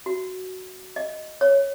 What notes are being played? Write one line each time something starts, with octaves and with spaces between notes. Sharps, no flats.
F#4
D#5
C#5